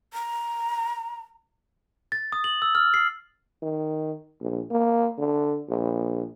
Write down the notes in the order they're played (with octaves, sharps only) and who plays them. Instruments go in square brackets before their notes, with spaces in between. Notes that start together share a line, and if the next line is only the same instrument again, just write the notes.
[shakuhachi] A#5
[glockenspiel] A6
D#6
F#7
E6
F6
C7
[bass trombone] D#3
A#1
A#3
D3
A#1